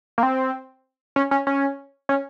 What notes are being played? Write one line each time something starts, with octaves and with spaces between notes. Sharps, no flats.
A#3
C4
C#4
C#4
C#4
C#4